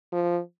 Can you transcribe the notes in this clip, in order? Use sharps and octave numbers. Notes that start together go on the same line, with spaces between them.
F3